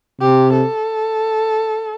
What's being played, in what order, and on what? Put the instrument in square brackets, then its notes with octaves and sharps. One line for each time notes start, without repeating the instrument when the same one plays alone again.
[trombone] C3 [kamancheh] G4
[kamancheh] A4